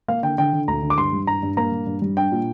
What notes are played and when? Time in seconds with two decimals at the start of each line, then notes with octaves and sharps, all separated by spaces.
0.08 A#3 F5
0.23 D3 G5
0.38 D3 G5
0.53 D3
0.68 D2 A#5
0.82 D3
0.90 D6
0.98 G2 C6
1.12 G3
1.27 G2 A#5
1.43 G2
1.57 A#3 A#5
1.72 G2
1.87 G2
2.02 G3
2.17 D4 G5
2.32 A#2